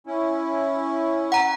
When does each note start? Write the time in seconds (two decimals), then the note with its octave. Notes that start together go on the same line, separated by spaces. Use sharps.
0.07 C#4 E4
1.32 F#5 A#5